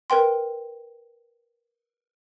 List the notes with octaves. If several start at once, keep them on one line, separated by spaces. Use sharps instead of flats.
A#4 B4 G5 C6